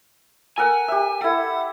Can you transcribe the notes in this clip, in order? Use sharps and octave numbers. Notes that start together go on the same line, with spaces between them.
A4 A#4 F#5 G#5
G4 E5
E4 A4 F#5